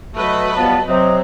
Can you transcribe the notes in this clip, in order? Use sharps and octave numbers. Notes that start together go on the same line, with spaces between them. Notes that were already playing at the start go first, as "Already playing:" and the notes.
F#3 A3 B4 D#5
F3 G3 B3 A5
C3 F#3 C4 D#5